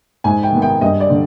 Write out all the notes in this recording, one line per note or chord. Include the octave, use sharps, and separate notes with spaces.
G#2 G#5
G5
D#3 B3
G5
G2 D#5
D5
D3